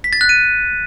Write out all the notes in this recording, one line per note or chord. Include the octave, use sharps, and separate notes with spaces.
B6
A6
F#6
D#7